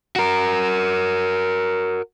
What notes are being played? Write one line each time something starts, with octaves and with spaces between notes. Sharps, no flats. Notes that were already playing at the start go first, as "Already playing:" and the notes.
F#4 A#4